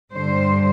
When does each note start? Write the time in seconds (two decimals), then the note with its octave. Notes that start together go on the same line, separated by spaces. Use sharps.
0.14 G2 D3 C5